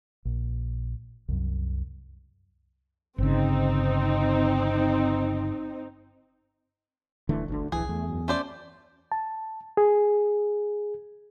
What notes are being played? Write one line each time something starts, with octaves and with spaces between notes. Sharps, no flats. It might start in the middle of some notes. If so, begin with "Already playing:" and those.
A#1
C2 F#2
G1 C#3 C4 D#4
D#1 D3 E3 A3
G1 D2 D3
D1 C2 E3 G#4
E2 A3
F#2
A3 C#4 C5 D5
A5
G#4